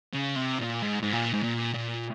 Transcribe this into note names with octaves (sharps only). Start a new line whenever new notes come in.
C#3
C3
A#2
G#2
G#2
A#2
G#2
A#2
A#2